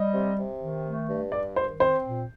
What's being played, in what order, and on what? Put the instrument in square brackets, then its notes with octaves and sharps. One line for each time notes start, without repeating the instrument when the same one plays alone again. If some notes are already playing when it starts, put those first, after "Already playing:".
Already playing: [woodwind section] G3 [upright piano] D#5
[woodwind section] C3
C3
D#3
A3
G2
[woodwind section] G2 [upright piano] D5
[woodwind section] D#3 [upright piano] C5
[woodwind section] C4 [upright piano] C5
[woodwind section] A#2